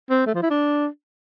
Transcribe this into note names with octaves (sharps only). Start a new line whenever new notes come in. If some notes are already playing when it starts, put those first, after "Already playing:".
C4
A3
F3
E4
D4